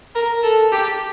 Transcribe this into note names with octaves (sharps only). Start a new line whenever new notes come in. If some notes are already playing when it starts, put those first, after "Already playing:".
A#4
A4
G4